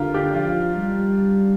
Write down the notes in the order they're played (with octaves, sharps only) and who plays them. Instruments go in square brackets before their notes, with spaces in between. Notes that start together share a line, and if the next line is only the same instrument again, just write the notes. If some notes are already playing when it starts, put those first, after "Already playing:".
Already playing: [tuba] D3 [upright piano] F4 G4 A#4
[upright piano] D4 G4
[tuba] F3 [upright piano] F4
[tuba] G3